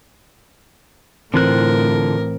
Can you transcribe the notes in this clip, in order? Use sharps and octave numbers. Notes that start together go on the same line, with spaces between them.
A2 D3 E3 C4 F4 A#4 F#6